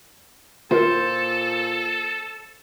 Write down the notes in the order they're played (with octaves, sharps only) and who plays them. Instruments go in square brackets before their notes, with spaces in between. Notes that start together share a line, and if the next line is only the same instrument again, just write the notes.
[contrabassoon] A#2 [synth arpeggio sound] E4 F4 A#4 [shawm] A4 [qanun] C5